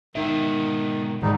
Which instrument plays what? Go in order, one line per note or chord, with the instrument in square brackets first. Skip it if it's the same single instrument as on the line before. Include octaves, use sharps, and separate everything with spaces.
[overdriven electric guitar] G#2 B2 [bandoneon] D#3 [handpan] D#4 E5
[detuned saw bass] G#2 [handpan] D#3 E3 [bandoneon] G3 D#4